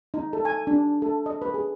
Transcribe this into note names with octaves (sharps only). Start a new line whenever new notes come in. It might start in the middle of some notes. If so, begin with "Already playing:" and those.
D#4
A4
G#5
D4
A4
D#5
B4
G#4